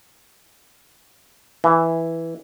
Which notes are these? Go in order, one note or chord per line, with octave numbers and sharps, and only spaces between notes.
E3